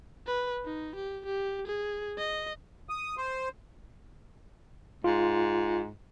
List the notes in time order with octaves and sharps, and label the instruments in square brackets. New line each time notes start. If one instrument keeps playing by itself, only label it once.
[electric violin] B4
D#4
G4
G4
G#4
D#5
[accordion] D#6
C5
[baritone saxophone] G#2 [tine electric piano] F4